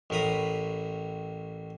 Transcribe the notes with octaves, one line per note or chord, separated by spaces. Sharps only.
A1 A2 A#4 B5 D#6